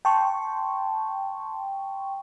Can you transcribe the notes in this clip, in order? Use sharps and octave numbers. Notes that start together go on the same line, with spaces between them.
G5 A5 C6 C#6